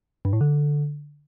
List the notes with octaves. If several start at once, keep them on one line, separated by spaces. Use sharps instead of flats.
G2
A2
D3